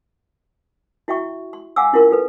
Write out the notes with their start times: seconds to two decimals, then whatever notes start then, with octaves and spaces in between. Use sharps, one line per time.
1.08 E4 F#4 E5 G5 C#6
1.53 C6
1.76 F5 F#5 G#5 D6 E6
1.93 C#4 E4 F4 A#4 C6
2.11 F4 A4 B4